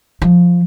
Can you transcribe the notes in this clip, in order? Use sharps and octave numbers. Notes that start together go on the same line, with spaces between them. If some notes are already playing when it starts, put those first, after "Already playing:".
F3